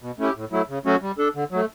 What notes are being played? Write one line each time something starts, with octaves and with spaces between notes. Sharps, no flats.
B2
A3 C#4 E4 G4
A2
F#3 A3 E4
C#3
F#3 A3 C#4 F#4
G3
D4 A4
D3
F#3 A3